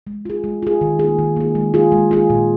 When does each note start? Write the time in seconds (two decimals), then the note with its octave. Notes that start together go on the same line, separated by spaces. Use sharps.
0.07 G#3
0.25 F4 G#4
0.44 G#3
0.62 F4 G#4
0.81 D#3
0.99 G#4
1.04 A#3
1.19 D#3
1.36 A#3 G#4
1.55 G#3
1.74 F4 G#4
1.92 G#3
2.11 F4 G#4
2.30 A#2